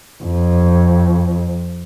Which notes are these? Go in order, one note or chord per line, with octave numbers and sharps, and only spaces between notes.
F2